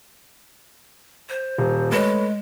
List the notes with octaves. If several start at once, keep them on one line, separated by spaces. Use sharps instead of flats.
C5
D#1
G#3 A3 B4 C#5